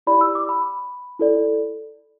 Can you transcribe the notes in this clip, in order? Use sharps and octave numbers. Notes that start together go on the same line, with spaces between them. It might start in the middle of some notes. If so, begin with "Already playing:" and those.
E4 G4 D5 B5
E6
D6
B5
E4 A4 D5